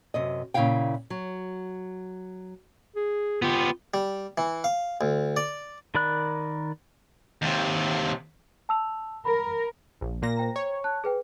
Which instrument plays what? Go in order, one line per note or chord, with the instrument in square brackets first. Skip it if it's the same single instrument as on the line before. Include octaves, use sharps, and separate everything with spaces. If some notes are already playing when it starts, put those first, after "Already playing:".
[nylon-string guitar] F#2 C3 D#5
A#2 C#3 E4 E5 F5 G5
F#3
[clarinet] G#4
[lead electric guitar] B3 G4 [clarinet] F4
[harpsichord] G3
E3
F5
D2
D5
[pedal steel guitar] D#3 A#4 D5 B5 F#6
[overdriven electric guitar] D#2 C3
[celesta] A5 E6 F7
[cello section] A#4 [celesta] B5
[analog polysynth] A#1
A#2 A#3 A#6
[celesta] C5 G5 A#5
[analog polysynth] C#5
[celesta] A5 F#6
G#4 B4 G5